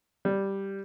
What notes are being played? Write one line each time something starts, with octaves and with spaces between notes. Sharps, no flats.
G3